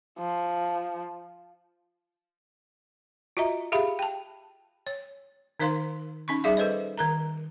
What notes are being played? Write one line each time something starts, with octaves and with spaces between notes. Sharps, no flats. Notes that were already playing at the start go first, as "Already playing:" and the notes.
F3
F4 F#4 D#5 E5 A#5
G4 G#4 E5 F5 B5
G5 A5
C#5
D#3 D#4 A#4 C5 F5 C6
C#4 D#4 B5 C#6
G3 D#4 G#4 E5 F5
A4 B4 C5 D#5
D#3 A#4 A#5